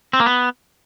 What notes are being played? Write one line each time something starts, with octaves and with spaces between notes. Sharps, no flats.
C4
A#3
B3